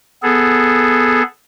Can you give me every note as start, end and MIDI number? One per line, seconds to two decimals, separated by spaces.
0.23 1.22 59
0.23 1.22 68
0.23 1.22 69